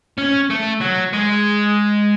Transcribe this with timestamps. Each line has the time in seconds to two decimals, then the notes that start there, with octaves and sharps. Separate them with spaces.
0.18 C#4
0.50 A3
0.81 F#3
1.13 G#3